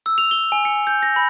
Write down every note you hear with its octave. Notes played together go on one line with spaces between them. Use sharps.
E6
F7
G7
G#5
C#7
G6
A#6
B5